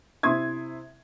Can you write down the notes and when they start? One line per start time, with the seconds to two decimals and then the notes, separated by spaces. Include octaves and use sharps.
0.23 C3 E4 E5 C6 D#6 G#6